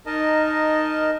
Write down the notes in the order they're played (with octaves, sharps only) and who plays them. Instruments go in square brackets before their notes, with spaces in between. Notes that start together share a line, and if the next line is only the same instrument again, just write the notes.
[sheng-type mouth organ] D#4 A#4 D#5 A5